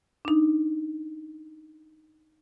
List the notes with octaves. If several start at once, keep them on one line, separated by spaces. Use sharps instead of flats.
D4 D#4